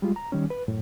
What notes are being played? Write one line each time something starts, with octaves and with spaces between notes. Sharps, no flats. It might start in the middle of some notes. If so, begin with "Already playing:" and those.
G3 G#3 F4
A#5
D#3 G3 C#4
B4
F#2 A2